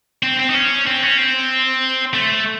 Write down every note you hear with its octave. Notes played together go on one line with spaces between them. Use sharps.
C4
C4
D#4
C#4
C4
C#4
C4
A3